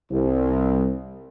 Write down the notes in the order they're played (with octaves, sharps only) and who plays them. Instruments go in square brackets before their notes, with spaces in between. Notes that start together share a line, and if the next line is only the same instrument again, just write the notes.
[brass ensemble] C2